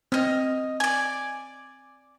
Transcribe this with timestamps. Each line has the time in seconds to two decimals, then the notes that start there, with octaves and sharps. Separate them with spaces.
0.12 C4 D#5 F6
0.80 D5 G#5